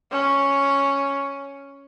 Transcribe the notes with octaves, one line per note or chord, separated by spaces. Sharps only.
C#4